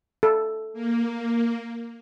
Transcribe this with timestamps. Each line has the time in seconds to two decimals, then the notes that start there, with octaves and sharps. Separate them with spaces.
0.23 A4
0.73 A#3